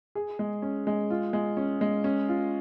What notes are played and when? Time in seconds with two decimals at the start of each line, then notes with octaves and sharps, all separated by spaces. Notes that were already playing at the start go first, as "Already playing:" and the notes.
0.15 G#4
0.39 G#3
0.62 C#4
0.87 G#3
1.10 F4
1.33 G#3
1.57 C#4
1.81 G#3
2.04 C#4
2.29 F4